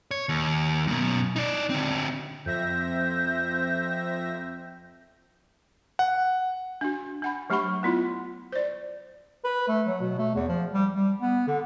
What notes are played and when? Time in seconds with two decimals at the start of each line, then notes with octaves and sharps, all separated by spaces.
0.11 C#5
0.29 D#2
0.87 F#2 B2
1.36 D#4 D5
1.70 D3 C4
2.46 F2 C4 E5 G6 A#6
5.99 F#5
6.81 D4 F#4
7.22 D4 F#5 B5
7.50 F#3 A3 G4 F#5 B5 C#6
7.83 B3 E4 F4
8.52 C5 D5
9.44 B4
9.68 A3
9.87 F#3
10.01 B2
10.19 A3
10.35 E2
10.48 F3
10.73 G3
10.94 G3
11.21 B3
11.47 D3